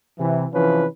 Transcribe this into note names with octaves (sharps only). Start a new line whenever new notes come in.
C3 E3
C3 E3 F3 C#4 B4